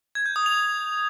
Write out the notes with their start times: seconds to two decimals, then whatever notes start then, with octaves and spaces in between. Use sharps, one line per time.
0.15 G#6
0.26 G6
0.36 D#6
0.46 F7